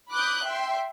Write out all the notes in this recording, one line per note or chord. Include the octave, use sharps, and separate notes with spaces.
B5 D6 D#6 F#6 G6
E5 G5 C6